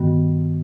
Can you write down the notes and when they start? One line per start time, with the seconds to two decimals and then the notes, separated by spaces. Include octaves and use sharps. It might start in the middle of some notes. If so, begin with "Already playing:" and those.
Already playing: G2 D#3 G3 B3 F#4